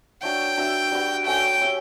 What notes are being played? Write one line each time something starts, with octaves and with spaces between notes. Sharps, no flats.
D4 F#4 C#5 E5 G5
D4 F#4 B4 E5
G3 D4 F#4 B4
A3 C#4 F#4 G5
C#4 G4 C#5 E5